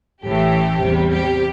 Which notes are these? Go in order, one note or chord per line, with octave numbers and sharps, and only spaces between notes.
A1 A2 E3 A3 G4
E2 C3 G3
G4